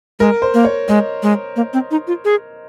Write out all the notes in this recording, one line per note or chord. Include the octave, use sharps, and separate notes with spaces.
G#3 A#4
C5
A#3
C#5
G#3 D#5
G#3
A#3
C4
D#4
F4
G#4